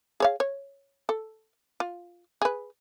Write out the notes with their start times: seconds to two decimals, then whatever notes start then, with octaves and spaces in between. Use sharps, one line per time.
0.20 G#4 C#5 F5
0.40 C#5
1.09 A4
1.80 F4
2.42 G#4 B4